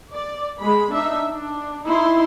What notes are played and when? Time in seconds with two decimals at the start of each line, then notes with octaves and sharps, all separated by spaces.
0.13 D5
0.60 G#3 B5
0.93 D4 D#4 E5
1.29 D4
1.86 D#4 E4 C6